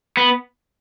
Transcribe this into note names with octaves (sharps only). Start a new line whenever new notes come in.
B3